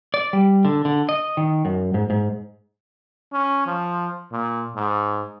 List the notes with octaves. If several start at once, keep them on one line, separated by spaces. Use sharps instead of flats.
D5
G3
D3
D3
D#5
D#3
F#2
G#2
G#2
C#4
F3
A#2
G#2